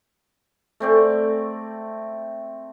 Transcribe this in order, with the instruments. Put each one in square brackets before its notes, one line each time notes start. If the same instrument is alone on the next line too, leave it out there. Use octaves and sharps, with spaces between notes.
[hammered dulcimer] A3 C4 D5